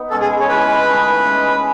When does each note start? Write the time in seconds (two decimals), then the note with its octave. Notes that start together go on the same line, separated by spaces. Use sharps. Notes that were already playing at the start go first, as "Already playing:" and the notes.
Already playing: B3 D#4
0.10 B2 G#3 C#4 A4
0.20 G#4
0.40 C#5
0.48 E3 G#3 C#4 E4 B4
0.87 D#3 A3 D#4 G#4
1.25 E3 G#3 C#4 E4